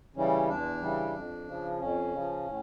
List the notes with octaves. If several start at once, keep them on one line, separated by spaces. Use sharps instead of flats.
C#3 E3 G3 C#4
E2 D4
C#3 E3 G3
F2
C#3 F3
F2 C#4
C#3 F3
A2